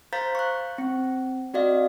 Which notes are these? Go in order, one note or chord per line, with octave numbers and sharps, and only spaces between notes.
C5 F5 A#5 G6 A6 B6
C#6 F#6
C4
C4 F#4 D5 D#5 F5